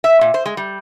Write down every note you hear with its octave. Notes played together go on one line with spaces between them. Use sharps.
E5
A#2
C5
G#3
G3